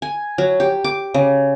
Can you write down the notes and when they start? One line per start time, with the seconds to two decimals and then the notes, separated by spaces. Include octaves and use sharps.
0.02 G#5
0.38 F#3
0.60 G4
0.84 D6
1.14 C#3